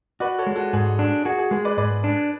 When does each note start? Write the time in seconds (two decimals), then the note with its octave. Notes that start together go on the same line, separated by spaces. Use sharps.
0.20 F#4 B4 D5
0.38 A4 C#5
0.47 G#3
0.56 F#4 A4
0.73 G#2 G#4
0.99 D4
1.25 F#4 G#4
1.38 G#4
1.51 G#3 G#4
1.65 B4 D5
1.77 G#2 B4 D5
2.04 D4